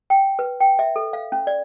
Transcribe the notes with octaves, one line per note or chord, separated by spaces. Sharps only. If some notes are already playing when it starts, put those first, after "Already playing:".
G5
B4
G5
E5
A4
F5
C#4
D5